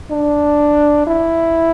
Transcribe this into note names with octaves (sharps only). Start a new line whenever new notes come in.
D4
E4